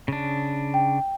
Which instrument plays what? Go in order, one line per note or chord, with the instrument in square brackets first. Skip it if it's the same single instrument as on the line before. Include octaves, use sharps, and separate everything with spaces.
[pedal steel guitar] C#3 D4
[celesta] G5